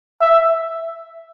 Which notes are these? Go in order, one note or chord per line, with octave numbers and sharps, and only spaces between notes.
E5